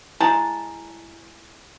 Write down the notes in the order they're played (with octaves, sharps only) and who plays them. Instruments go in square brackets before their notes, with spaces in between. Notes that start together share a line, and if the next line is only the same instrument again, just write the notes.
[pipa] G#3 A5 [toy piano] E4